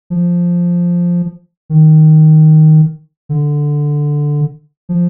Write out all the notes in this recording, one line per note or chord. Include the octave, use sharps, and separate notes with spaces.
F3
D#3
D3
F3